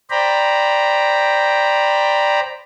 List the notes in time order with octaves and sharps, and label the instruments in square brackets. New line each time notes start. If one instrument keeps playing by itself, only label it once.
[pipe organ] C5 D5 G5 A#5 B5